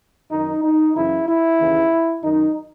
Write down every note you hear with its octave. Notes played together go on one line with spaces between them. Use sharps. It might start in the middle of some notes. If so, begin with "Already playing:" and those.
F#2 D#3 D#4
D#4
F#2 C#3 E3 E4
E4
D#2 C#3 E3
F#2 D#3 D#4